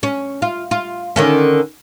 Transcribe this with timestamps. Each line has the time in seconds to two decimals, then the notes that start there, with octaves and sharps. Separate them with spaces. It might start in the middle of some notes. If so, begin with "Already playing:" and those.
0.03 C#4
0.42 F4
0.71 F4
1.16 D3 D#3 C#4